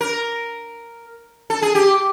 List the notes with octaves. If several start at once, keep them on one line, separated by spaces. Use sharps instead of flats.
A#4
A4
G#4
G4